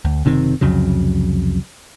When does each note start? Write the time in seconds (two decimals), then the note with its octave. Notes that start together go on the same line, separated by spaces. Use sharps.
0.05 D2
0.25 F#1 C3 D#3 C4
0.61 C2 F2 C#3 F#3